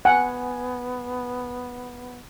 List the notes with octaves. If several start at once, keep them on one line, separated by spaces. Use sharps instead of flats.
B3 F#5 G#5